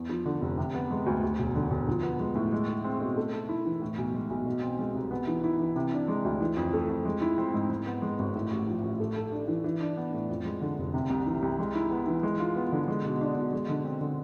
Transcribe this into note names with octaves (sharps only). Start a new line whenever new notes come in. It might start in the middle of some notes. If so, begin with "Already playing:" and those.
Already playing: E2
F3
D3
F1
C3
B3
G#3
D2
D2
E1
D3
E1
F3
B3
G#3
A2
G#3
G#4
C4
B2
A3
A4
E4
E3
A2
B1
G#3
B1
B2
C4
G#3
C2
B3
E3
E4
E3
C3
D4
G#3
D2
E3
F2
A3
F2
G#3
E4
C4
G#2
G#2
B3
G#3
G#1
A2
A1
F3
A1
A3
A4
D4
E3
E3
D4
B3
A2
F2
G#3
D3
F1
C3
C2
E3
C2
G#3
E4
B3
E3
G#3
F4
B3
D3
G#3
B2
D4
B2
G#3
D3
C4
D3